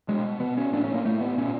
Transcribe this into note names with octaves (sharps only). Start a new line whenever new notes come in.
B2 G#3
B2 B3
C#4
A2 D4
C#4
A#3
A2 A3
B3
A#2 C#4